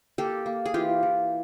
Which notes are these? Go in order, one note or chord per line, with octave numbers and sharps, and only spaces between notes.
A#3 G4 A4
A#3
G#4
E3 F4 G4
E3